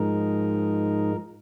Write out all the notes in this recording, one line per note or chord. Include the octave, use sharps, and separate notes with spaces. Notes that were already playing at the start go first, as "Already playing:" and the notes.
Already playing: G#2 F3 G#3 D#4 A#4